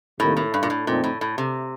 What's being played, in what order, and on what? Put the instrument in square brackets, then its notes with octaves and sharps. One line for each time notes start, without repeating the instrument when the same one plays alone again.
[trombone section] C2 C3 D#3 A#3 [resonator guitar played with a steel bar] A2
[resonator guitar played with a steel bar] A2
G2
A#2
A2
[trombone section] F2 D3 A3 C4 D#4 [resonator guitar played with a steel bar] A#2
[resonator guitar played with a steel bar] A2
A2
C3